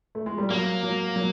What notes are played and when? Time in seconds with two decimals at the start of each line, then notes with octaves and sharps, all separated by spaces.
0.15 A3
0.26 G#3
0.38 G3
0.50 F#3 A#3
0.83 F#3
1.16 F#3